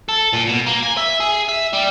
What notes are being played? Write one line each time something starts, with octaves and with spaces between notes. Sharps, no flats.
A4
A#2
B2
A#3
G#5
E5
G#4
E5
G3